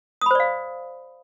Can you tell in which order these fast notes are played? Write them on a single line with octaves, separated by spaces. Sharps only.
D#6 B5 C5 D5 F5